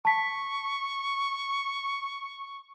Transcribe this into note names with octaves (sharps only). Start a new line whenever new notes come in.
A5 C#6 B6